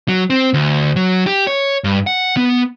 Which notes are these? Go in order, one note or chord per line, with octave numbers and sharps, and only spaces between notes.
F#3
C4
D2
F#3
G4
C#5
G2
F#5
B3